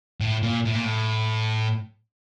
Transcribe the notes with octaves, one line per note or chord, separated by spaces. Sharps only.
A2
A#2
A2
A#2
A2